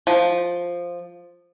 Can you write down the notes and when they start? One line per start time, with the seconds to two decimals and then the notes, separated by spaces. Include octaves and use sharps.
0.07 F3